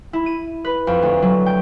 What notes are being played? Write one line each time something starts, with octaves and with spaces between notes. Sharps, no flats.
E4
D#7
B4
F2
D2
F#3
G5